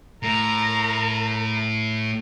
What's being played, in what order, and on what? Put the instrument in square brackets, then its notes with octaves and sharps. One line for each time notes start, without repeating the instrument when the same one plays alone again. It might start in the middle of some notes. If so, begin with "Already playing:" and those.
[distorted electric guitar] A2 [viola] A#4 A#5